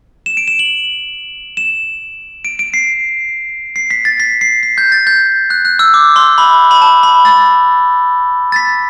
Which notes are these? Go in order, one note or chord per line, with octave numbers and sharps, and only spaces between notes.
E7
D7
E7
F#7
E7
D7
D7
C7
C7
B6
A6
B6
C7
B6
G6
A6
G6
F#6
F#6
E6
D6
C6
B5
B5
A5
B5
A6
A6
B6